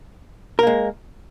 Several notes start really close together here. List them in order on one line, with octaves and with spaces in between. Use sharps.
A#4 A#3 G#3